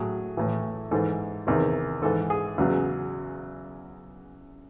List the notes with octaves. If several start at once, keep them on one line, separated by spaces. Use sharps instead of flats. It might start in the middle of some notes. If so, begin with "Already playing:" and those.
Already playing: A2 F#3 G#4
A2 E3
G#2 E3 A4
E2 C3 D#3
G#2 E3 A4
G#4
E2 C#3 F#3